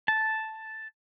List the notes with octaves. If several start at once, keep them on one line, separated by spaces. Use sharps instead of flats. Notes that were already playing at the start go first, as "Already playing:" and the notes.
A5